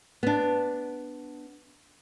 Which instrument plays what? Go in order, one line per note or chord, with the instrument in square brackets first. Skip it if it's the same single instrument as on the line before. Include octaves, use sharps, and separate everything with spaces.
[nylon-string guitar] B3 D4